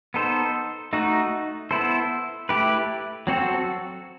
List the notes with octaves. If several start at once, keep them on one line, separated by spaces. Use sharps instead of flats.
B3 D#4 A4 C5
A3 D#4 F#4
B3 E4 A4 C5
A3 E4 G4 B4
F#3 C4 F#4 A4